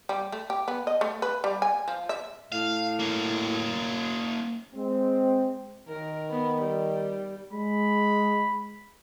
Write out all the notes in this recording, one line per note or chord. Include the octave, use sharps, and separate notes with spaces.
G3
A3
G4
B3
D#5
A3
B4
G3
G#5
F3
E5
A2 F5
A#3 C#4
G#3 C4
D#3 A#4
B3
G3
G#3 B5